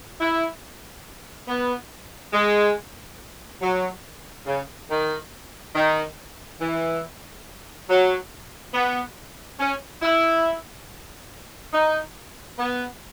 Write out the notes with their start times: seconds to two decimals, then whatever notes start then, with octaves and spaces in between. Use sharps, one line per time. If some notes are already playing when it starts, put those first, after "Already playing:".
0.19 E4
1.48 B3
2.33 G#3
3.62 F#3
4.47 C#3
4.90 D#3
5.75 D#3
6.60 E3
7.89 F#3
8.74 B3
9.59 C#4
10.02 E4
11.72 D#4
12.58 B3